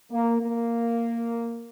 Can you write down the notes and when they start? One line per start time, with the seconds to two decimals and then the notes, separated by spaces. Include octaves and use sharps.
0.11 A#3
0.41 A#3